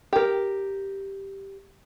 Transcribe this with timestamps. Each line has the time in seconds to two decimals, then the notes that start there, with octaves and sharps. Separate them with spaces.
0.13 G4 A#4